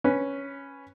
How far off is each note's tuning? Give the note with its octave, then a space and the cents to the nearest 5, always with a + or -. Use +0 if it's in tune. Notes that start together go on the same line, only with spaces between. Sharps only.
C#4 +0 B4 +0